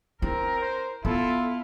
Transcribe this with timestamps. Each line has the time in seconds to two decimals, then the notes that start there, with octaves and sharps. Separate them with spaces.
0.22 C4 E4 A#4
0.61 C5
1.05 B3 E4 F4 A4